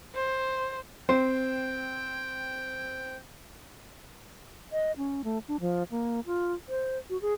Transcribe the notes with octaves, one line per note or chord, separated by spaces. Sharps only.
C5
C4 C5 G5
D#5
C#4
A3
D4
F3
A#3
F4
C5
F#4
G#4